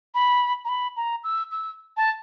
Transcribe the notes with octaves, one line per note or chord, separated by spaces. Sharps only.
B5
A#5
B5
A#5
E6
E6
A5